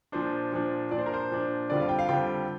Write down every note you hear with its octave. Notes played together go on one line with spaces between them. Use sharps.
A#2 F3 D4 C5
A#2 F3 D4
A#2 F3 D4 D5
C5
A#4
C5
A#2 F3 D4
F2 D3 G3 C4 F4 D5
F5
G5
F5
F2 D3 G3 C4 F4 G5